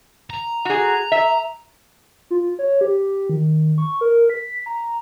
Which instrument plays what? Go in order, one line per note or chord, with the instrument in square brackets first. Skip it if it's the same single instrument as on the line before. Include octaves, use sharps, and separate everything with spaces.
[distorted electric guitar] A#5
[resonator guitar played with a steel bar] F#4 G#4
E5
[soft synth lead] F4
C#5
G4
D#3
C#6
A#4
B6
A#5